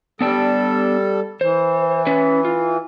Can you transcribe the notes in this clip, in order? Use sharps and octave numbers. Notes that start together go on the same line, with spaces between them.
G3 B3 D4 A4 G5
E3 C5
C#4 B4
F4